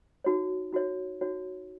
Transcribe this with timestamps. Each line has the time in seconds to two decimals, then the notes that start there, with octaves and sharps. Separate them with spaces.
0.24 D#4 F#4 C#5
0.73 D#4 F#4 C#5
1.21 D#4 F#4 C#5